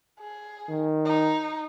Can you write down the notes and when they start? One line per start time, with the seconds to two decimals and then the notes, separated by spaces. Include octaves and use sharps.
0.20 G#4
0.69 D#3
1.05 D#4